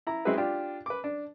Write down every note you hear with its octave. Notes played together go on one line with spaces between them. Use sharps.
E4 A#5
G#3 C4 E4 F#4 G#4 B4
D4 F4 G4
B4 D6
D4